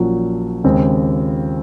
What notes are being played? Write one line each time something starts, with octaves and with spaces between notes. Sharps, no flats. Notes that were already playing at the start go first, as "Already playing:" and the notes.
Already playing: A#1 A#2 F#3 C#4
D#2 C#3 G#3 C4